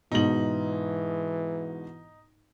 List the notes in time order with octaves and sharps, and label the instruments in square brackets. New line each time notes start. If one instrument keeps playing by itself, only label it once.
[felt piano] G#2 B2 [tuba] E3 [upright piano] D#4 F#7